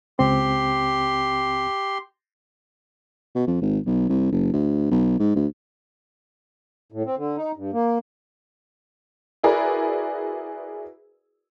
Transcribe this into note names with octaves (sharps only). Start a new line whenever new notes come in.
C#2 C4 G4 C6
B2
F2
G#1
B1
C2
F#1
D2
B1
G#2
D2
A2
C4
D3
D#4
G2
A#3
E4 F#4 G#4 A#4 B4 D5